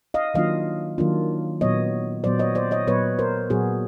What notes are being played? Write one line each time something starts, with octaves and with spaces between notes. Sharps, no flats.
D#5 F5
D#3 F#3 A#3 D4 F4 D#5 F5
D#3 F#3 A#3 D4 F4
A#2 F#3 B3 C#5 D#5
A#2 F#3 B3 C5 D5
C#5 D#5
C5 D5
C#5 D#5
A#2 F#3 B3 B4 C#5
A#4 C5
A#2 F#3 B3 F#4 G#4